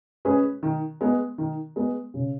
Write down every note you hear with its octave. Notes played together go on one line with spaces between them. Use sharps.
G#3 C#4 G#4 B4
D#3
G#3 B3
D#3
G#3 B3
C#3